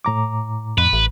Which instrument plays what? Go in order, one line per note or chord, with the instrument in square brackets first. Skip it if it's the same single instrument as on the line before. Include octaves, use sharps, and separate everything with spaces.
[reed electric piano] A2 A#5 D6
[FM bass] F2 [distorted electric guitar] B4
[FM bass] A1